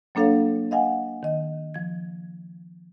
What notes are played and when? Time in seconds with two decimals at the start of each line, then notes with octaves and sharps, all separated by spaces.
0.15 F#3 A#3 D4 A4 C#5 F5
0.71 D#5 F5 F#5 G#5
1.23 D#3 D#5
1.74 F3 G#6